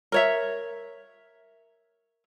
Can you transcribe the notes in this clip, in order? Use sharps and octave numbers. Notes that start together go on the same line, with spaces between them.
A#4 C#5 E5